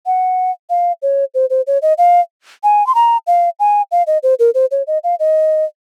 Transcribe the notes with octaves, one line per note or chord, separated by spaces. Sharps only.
F#5
F5
C#5
C5
C5
C#5
D#5
F5
G#5
C6
A#5
F5
G#5
F5
D#5
C5
A#4
C5
C#5
D#5
F5
D#5